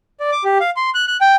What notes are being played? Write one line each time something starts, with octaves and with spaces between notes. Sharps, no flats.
D5
D6
G4
F5
C6
F#6
F#6
G5